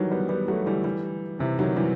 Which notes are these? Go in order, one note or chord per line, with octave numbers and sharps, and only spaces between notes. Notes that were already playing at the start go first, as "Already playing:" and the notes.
Already playing: D#3 E3 F#3 G3
G3 B3
G3 B3
F#3 A3
E3 G3
E3 G3
C3 E3
D#3 F#3
E3 G3